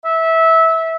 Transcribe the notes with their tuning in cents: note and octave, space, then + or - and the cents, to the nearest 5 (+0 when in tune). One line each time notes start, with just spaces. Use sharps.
E5 -20